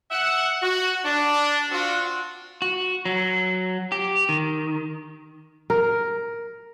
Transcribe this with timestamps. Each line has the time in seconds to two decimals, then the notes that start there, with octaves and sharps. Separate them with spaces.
0.11 E5 F#5
0.61 F#4
1.04 D4
1.70 C4 D4 F4 F#4
2.62 F#4
3.06 F#3
3.92 G4
4.29 D#3
5.70 A#4